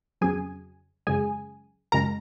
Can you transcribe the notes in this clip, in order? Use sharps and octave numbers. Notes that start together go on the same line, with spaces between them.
F2 C#3 F#3 G#4 G#5
F#2 C#3 G#3 G#4 G#5
F#2 C#3 G#3 A#4 A#5